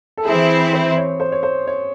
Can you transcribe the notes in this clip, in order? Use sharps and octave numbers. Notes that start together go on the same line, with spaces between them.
A4
E3 C4 E4 G#4
C5
C#5
C5
C#5
C5
C#5